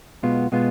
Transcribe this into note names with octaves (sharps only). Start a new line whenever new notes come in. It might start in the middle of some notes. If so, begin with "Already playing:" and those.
B1 B2 G#3 B3 F4
B2 G#3 B3 F4